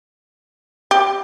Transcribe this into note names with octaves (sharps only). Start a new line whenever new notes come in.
G4